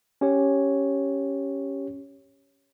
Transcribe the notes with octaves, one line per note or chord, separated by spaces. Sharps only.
C#4 G4 C#5